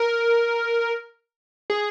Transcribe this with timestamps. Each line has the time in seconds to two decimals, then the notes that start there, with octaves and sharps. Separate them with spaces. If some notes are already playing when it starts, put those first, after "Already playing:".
Already playing: A#4
1.70 G#4